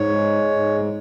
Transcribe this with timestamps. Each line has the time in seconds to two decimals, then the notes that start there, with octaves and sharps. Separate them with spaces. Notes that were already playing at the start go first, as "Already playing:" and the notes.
Already playing: G#2 C#5
0.09 G#3
0.51 G#2